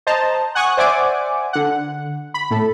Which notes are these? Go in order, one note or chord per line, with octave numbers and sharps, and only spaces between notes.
C5 D#5 A5 A#5
F#5 G#5 C#6 D#6 F#6
C5 D5 E5 F#5 G#5 D6
D3 F#5
B5
A2 A4